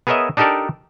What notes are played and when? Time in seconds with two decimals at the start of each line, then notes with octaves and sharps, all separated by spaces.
0.07 B3 G#4 A#4 C#5 D#5 E5
0.37 D4 D#4 G4 A4 A#4 D5